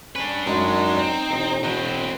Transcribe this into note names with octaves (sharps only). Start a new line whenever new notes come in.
C#4 D4 B4
F#2 G#3 D#4
C4
E1 D#5
B2 C4 B4